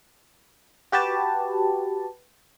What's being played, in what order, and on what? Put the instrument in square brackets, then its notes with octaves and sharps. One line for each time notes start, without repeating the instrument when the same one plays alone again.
[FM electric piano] F#4 G4 B4 A5